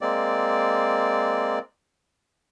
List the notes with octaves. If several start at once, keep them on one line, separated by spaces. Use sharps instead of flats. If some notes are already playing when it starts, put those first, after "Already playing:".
G#3 A#3 C4 D5